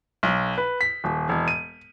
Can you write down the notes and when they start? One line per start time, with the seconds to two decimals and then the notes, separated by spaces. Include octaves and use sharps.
0.23 B1
0.58 B4
0.81 B6
1.04 D#1
1.29 E1
1.48 D#7